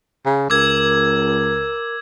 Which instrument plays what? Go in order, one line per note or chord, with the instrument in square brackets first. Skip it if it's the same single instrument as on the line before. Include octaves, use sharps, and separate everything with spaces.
[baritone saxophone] C#3
[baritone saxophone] C#2 [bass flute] A#4 [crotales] D6 E6 G#6